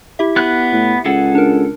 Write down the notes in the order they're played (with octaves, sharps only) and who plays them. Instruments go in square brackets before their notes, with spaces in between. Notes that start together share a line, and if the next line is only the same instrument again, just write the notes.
[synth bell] E4 G4 E5
[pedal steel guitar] B3 F#6
[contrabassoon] A2
[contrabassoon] C#2 [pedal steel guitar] G#4 A4 F#5
[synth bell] D4 A#4